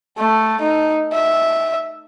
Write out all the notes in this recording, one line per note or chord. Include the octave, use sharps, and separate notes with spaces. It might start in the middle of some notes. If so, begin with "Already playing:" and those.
A3
D#4
E5